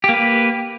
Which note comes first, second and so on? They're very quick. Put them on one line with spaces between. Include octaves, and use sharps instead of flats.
G4 A#3 B4